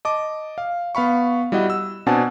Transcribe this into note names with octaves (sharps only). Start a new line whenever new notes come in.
D#5 A5 D6
F5
B3 F5 B5 C#6
G3 E4 F#4 D#5 F#5
E6
B2 C4 D4 F#5 G#5 A5